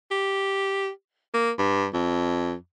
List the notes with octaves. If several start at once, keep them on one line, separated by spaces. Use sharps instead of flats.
G4
A#3
G2
F2